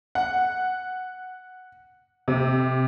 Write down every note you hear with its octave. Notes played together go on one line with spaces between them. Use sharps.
F#5
C3